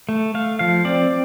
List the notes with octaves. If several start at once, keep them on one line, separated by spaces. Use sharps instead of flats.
A3
A3 F5
F3 F5
C4 D5